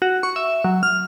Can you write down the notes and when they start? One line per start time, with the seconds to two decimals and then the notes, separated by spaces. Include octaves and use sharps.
0.02 F#4
0.23 C#6
0.36 E5
0.64 F#3
0.83 F6